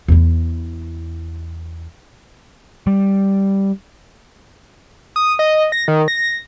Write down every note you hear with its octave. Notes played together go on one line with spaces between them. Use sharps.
E2 E4
G3
D#6
D#5
A#6
D#3
A#6